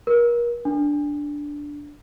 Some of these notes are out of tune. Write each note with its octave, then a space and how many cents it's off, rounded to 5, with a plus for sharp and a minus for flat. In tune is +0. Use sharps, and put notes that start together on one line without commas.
A#4 +35
D4 -5